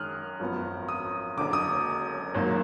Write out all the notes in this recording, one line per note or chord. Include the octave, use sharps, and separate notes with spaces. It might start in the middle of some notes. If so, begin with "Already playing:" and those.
Already playing: F#2 D#3 G#3 D#6 F6 F#6
G#1 F#2 F3 B3
D#6
F#1 F#2 D3 D6
D#6
G#1 G#2 F#3 A#3